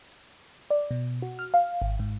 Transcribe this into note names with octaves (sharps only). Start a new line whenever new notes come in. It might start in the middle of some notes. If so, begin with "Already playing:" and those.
D5
B2
F#4
F6
F5
G#1
G#2